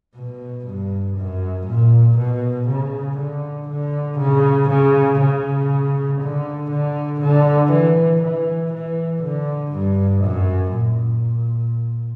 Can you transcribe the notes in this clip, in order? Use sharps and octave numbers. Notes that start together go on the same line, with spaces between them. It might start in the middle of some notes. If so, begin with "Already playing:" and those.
B2
G2
F#2
A#2
B2
C#3
D3
D3
C#3
C#3
C#3
D3
D3
D3
E3
E3
E3
D3
G2
F#2
A#2